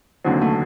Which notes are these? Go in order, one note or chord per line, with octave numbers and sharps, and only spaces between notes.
F1 D#2 D3 F#3 C4
A3